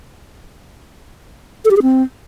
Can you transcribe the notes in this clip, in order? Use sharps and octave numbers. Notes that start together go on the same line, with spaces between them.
A4
G4
G#4
C4